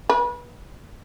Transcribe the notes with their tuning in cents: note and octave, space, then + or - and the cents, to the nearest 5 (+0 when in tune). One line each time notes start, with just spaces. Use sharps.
B4 -30